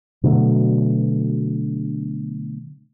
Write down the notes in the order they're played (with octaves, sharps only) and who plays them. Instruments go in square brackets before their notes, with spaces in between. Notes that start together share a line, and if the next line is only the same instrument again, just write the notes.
[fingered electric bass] B2 D3 F#3 A3